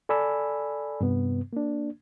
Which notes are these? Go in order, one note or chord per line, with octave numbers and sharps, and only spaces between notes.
A4 D5 G#5 B5 E6
G2 C3 B3
A#3 D4